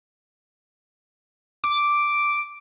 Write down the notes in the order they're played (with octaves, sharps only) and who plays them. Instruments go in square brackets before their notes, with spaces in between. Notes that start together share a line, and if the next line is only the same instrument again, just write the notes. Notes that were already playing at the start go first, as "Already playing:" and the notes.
[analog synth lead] D6